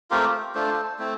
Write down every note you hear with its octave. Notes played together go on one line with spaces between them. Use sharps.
A3 C4 F4 G4 A#4
A3 D4 F4 A4 C5
A3 C4 E4